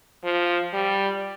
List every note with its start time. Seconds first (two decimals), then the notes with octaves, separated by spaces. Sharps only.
0.24 F3
0.73 G3